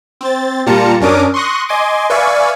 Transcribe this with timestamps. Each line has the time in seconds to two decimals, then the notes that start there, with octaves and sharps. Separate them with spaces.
0.21 C4 A6
0.66 A#2 G3 F4 A5 A#5 C#7
1.01 F#2 C#4 D4 A#4 D6 D#6
1.34 C6 C#6 D#6 F#6 A#6
1.69 D#5 G#5 C6 D6
2.10 B4 D5 E5 F5 G#5 C#6